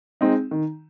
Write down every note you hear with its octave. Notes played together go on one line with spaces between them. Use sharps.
G#3 C4 D#4
D#3